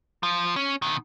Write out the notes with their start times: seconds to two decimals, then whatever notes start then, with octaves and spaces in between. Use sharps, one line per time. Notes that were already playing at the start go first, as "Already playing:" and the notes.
0.23 F3
0.56 C#4
0.82 B2 D#3